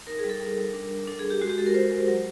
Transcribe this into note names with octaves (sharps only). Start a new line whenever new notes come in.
D#4 A#4
G#4
G3
A4
G3 A#4
G3
D4
D4
D4 A4
D4 G#4
G4
G#3 F#4
G4
G#3 A4
A#4
F4 C5
G#3
F#3